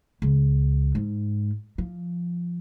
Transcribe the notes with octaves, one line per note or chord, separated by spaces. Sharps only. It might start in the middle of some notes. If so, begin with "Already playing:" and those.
C#2
G#2
F3